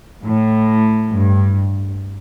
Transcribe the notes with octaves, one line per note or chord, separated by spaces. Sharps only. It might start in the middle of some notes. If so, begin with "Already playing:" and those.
A2
G2